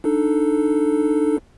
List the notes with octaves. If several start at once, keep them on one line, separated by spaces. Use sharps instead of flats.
D4 D#4 A4